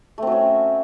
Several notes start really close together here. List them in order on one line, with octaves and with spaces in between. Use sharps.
A3 C4 F#3 C#4